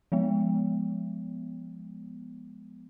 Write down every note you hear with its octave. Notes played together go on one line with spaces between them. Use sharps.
F3 G#3 B3